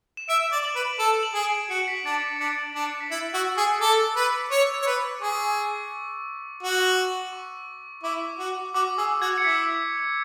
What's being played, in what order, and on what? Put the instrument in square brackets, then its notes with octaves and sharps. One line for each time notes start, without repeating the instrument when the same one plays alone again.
[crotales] E7
[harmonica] E5 [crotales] D7
[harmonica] D5
[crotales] F#7
[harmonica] B4
[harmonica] A4 [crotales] E7
[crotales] F#7
[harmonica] G#4
[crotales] D7
[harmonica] F#4 [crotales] C#7
[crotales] B6
[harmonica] D4 [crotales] A6
[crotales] C#7
C#7
[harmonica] D4 [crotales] B6
[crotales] A6
[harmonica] D4
[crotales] F#6
B6
[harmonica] E4 [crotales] A6
[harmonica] F#4 [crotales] E6
[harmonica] G#4 [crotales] E6
[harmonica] A4 [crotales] D6
[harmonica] B4
C#5
C#5
B4
[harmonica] G#4 [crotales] C#6
[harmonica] F#4
[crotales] C#6
[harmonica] E4 [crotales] D6
[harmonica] F#4
[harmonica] F#4 [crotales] D6
[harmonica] G#4 [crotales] E6
[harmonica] F#4 [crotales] G#6
[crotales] C#7
[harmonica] E4 [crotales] B6